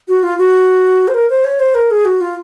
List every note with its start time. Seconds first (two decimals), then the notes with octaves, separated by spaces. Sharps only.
0.08 F#4
0.23 F4
0.38 F#4
1.08 C5
1.14 A#4
1.30 C5
1.44 C#5
1.60 C5
1.75 A#4
1.91 G#4
2.05 F#4
2.21 F4